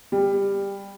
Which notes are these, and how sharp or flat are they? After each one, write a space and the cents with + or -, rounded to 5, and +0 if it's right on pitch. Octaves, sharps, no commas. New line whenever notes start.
G3 +15